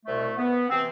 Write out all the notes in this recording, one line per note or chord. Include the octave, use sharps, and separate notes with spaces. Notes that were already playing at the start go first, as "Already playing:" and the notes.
C2 B2 A3
B3
C3 E3 C4